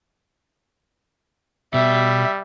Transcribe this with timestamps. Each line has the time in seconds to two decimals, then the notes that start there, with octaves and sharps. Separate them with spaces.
1.74 B2 G3 E5